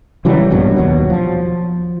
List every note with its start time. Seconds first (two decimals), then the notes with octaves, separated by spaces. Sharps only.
0.25 C#3 E3 F#3 G3
0.50 A#1 G2 B2 F#3
0.76 D#2 B2 F#3
1.10 F3